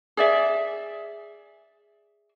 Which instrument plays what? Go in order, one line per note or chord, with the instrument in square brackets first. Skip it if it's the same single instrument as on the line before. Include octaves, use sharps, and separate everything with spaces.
[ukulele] G#4 D5 E5